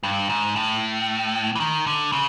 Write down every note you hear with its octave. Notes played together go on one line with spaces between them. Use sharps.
G2
G#2
A2
E3
D#3
D3
C#3